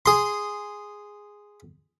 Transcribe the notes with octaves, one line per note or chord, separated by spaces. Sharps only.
G#4 C6